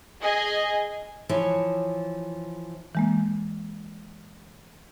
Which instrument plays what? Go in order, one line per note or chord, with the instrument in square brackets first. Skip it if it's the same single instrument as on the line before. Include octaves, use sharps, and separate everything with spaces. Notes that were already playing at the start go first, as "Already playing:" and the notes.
[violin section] G#4 D#5 G#5
[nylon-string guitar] E3 F3 C#5
[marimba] E3 G#3 A#3